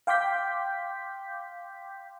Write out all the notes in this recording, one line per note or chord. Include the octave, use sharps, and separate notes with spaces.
F5 G5 C6 D6 G6 B6